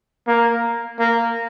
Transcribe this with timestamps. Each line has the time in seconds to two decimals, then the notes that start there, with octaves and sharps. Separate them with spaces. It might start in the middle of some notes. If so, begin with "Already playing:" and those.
0.27 A#3
0.99 A#3